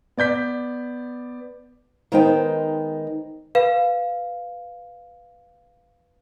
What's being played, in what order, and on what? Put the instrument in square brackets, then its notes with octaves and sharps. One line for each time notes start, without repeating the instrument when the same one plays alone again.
[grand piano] B3 D5 G6 B6
[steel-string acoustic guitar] D#3 G#3 B3 D#4 C5 G5
[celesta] B4 F5